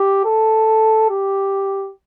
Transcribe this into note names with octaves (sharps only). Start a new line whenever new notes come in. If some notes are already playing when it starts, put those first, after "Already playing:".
Already playing: G4
A4
G4